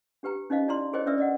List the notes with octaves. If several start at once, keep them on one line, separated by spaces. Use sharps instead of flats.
D4 G4 B4 G5 A#5
C#4 D#4 C5 D#5 F5
E4 D5 A#5 C6
G#4 A#4 C5 C#5 D#5 G5
C#4 D4 B4 D5 E5 E6
D5 D#5 F#5